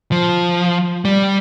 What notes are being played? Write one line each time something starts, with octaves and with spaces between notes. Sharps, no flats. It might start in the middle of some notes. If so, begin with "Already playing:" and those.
F3
G3